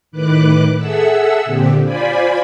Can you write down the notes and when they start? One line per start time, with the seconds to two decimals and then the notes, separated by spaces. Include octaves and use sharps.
0.12 A2 D#3 B4 D6 F#6
0.77 G#4 A4 E5 F#5 E6
1.45 A#2 D3 C4 G4
1.83 F4 C5 D5 G#5 B5